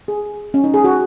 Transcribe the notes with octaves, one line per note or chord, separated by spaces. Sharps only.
G#4
C#4
D#4
G#4
F#4